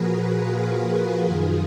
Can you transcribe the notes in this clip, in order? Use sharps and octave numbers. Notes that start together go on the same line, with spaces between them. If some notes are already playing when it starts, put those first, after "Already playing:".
Already playing: A#2 F3 F#4 G#4 A#4 B4
F4 G#4
F#2 D#3